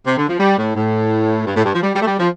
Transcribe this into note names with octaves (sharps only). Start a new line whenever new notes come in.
C3
D3
F3
G3
A2
A2
G2
A2
G2
F3
G3
G3
A3
G3
F3